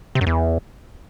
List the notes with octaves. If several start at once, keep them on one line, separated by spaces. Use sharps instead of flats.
C3
F#2
E2